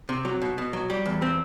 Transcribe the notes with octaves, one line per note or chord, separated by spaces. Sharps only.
C3
F#3
B2
B2
F#3
G3
E2
C4